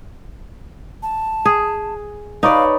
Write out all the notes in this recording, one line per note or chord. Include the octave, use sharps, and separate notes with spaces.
A5
G#4
D#4 G4 B4 C#5 D5 F5